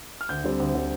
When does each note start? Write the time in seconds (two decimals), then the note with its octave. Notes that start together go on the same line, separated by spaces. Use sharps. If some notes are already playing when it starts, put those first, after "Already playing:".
0.21 F6
0.29 D2 G6
0.44 D3 G3 C4
0.60 D2
0.75 D3 G3 C4